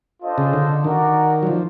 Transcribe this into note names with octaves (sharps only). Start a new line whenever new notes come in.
D4 F4 A4 C5 D#5
C#3
D3
D#3 F#4 A#4 D5
F#3
F3